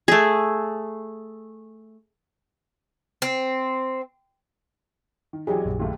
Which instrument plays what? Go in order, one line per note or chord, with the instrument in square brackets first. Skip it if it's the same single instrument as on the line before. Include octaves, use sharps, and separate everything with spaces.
[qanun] A3 G#4
[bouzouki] C4
[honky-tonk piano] D#3
[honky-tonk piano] B1 E2 F#3 [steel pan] G4 G#4
[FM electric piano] A#1 F#2
[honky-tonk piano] D#2 A3 A#3